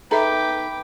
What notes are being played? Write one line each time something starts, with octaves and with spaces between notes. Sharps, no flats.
D#4 A4 B4 E5 G5 A#5 D6